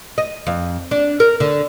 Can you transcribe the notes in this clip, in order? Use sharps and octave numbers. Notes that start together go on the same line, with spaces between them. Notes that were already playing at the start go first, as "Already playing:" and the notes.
D#5
F2
D4
A#4
D3